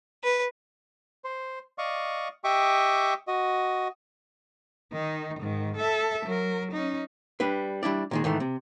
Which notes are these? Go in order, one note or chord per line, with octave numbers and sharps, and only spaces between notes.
B4
C5
D5 D#5 F5 C#6
G4 D#5 E5 G5 C#6 D6
F#4 D#5
D#3 D#4
G#2 D#3
A4 E5
F#3 A#4
C#4 D#4
G3 D4 B4
G3 D4 E4 D5
A#2 D#3 G#3
G#2 D#3 E3 A3
C3